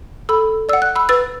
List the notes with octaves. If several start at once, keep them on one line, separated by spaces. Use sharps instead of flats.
A4 B5 E6
D5 F#5 E6
F#6
B5 E6
B4 E6 A6